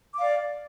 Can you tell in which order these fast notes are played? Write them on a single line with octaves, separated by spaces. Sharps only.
D6 F5 D5